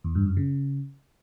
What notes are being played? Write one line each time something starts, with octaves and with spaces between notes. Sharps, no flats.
E2
G2
F#2
C#3